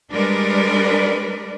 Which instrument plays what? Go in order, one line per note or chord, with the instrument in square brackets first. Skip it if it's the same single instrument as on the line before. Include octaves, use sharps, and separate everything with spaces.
[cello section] G3 G#3 D4 A#4 B4 D5